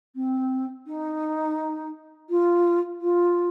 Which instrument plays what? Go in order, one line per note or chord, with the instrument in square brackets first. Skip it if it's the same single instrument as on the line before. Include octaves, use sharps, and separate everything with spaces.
[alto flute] C4
D#4
F4
F4